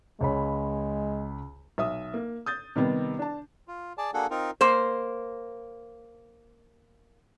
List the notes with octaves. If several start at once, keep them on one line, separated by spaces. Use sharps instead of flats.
C#2 G#3 C#5 B5
B1 E5 D#6
A#3
D#6 G6 A6
C3 D#3 G3 B3
D4 A5
F4
G#4 D5 A5
A#3 D4 F#4 G#4 A4 F#5
C4 D#4 F4 A#4
A#3 C5